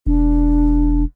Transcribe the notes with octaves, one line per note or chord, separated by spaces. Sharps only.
E1 D4